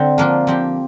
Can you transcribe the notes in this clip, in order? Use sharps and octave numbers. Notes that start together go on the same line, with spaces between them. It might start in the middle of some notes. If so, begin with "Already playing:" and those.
Already playing: D3 C4
F3 A#3 D4 F4
F3 C4 G4